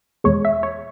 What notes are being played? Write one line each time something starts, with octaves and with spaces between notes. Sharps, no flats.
E2 B2 G#3 C#5
E5
C#5